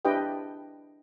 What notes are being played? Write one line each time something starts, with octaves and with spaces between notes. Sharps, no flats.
D4 E4 G4 B4 D#5 G5